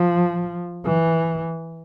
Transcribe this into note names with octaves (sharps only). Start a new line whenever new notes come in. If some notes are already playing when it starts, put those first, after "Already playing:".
Already playing: F3
E3